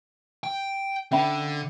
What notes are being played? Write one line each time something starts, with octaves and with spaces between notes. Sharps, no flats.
G5
D3 C#4 E5 B5